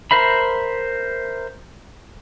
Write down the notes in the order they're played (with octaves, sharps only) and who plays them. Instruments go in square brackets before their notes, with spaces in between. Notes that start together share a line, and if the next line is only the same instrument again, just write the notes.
[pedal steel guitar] A#4 C5 E5 B5